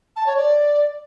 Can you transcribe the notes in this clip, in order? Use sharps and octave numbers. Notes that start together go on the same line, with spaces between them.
A5
C#5
D5